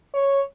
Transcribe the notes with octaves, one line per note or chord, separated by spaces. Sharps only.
C#5